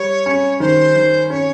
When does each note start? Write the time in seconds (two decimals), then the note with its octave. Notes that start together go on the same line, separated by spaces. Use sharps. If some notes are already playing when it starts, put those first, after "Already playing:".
Already playing: G3 C#5
0.26 C#4
0.60 D#3 C5
0.96 D#3
1.30 C#4 C#5